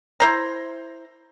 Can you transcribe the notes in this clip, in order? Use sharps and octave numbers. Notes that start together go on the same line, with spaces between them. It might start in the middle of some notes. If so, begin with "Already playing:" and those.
E4 C5 A#5